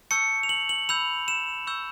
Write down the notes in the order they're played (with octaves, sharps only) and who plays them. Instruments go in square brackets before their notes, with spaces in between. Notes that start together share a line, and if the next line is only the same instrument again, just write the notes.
[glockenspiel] A5 C#6 E6 G6 C#7
F7
F#7
F#7
B5 E6 G6 F7
E7
C#6 E6 G6